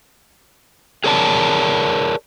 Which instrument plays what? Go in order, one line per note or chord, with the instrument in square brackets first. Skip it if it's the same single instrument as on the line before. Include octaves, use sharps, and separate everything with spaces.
[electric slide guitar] G#4 A#4 C#5 D5 F5 A5